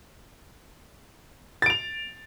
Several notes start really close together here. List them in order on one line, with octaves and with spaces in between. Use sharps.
A6 D7 F7